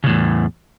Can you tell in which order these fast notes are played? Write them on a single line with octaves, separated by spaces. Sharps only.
C#3 A2 E2